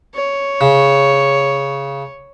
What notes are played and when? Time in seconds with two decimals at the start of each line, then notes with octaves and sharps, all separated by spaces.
0.15 C#5
0.61 C#3